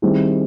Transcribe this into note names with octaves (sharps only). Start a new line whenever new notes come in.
D#3 G3 C4 E4 G#4